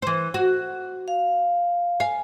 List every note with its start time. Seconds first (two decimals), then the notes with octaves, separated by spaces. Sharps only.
0.02 E3 C5
0.34 F#4
1.08 F5
2.00 F5 G#5